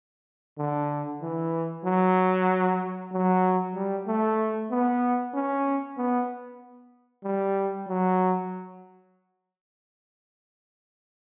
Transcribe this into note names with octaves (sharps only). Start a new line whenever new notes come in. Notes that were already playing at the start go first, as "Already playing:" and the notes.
D3
E3
F#3
F#3
G3
A3
B3
C#4
B3
G3
F#3